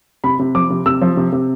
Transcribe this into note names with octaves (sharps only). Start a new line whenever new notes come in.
C3 B5
C3
F3 D6
C3
C3 E6
F3
C3
C3